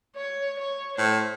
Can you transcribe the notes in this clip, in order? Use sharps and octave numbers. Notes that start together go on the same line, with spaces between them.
C#5
C#5
A2 C5